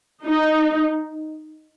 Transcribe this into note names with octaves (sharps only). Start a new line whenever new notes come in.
D#4